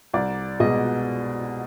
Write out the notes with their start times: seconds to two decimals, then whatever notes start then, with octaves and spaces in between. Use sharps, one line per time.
0.14 C2 D5
0.60 B2 G#3 D#5